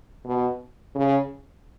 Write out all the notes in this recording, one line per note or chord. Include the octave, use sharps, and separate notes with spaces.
B2
C#3